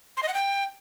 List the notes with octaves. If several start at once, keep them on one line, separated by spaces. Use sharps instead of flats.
C6
D#5
F#5
G5